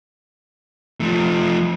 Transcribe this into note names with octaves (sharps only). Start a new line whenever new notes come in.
F3 A3